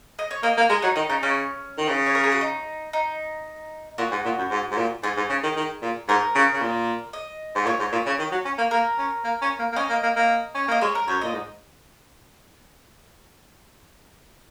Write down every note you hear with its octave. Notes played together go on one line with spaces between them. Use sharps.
D#5
C#5
A#3 D#5
A#3
G#3 A#4
F#3 D#4
D#3 D#4
C#3 D#4
C#3 C#4
D#3
C#3
C#5
A#4
G#4
F#4
D#4
D#4
A#2 F#4
G#2
A#2
F#2
G#2
G#2
A#2
G#2 G#4
G#2
C#3
D#3
D#3
A#2
G#2 A#4
C#3
C#3
A#2
D#5
G#2
A#2 C#5
G#2
A#2
C#3
D#3
F#3
C#4
A#3
A#3 A#4
C#4
A#3
C#4
A#3
A#3
C#4 D#5
A#3
A#3
A#3
C#4
A#3 D#5
G#3 C#5
A#4
F#2 C#5
A#2 D#5
G#2